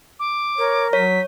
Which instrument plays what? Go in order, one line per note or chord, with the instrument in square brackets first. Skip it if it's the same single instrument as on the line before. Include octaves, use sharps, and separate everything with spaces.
[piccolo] D6
[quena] A#4 [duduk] C#5
[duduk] F#3 [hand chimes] C#5 [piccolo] B6